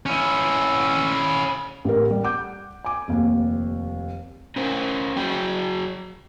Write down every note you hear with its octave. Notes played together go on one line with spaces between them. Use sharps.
C#4 E4
A1 G4 A#4
G3
F#5 D6 G6
G#5 D6
F1 D#2
C#4 A#4 C5
F#3 F#4 G#4 G5